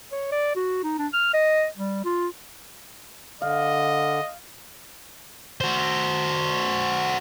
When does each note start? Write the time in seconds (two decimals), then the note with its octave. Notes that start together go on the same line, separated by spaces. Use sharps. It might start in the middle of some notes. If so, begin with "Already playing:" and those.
0.12 C#5
0.32 D5
0.56 F#4
0.83 D#4
0.99 D4
1.13 F6
1.34 D#5
1.77 G3
2.05 F4
3.42 D3 D#5 F5
5.61 F#4 C5